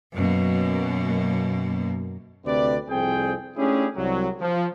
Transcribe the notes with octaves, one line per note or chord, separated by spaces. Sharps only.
F#2 B2 A#3
D2 C3 C4 B4 D5
C2 F2 C4 G#4 G5
A3 C#4 D4 E4 G4 G#4
C2 F#3
F3